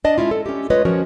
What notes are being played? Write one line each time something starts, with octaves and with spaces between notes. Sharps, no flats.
D4 D5 D#5 A5
G#3 A#3 C#4 E4 F4
A4
C#4 G4
G#3 A3 F4 B4 C#5 D#5
F3 C#4 F#4 A#4 C#5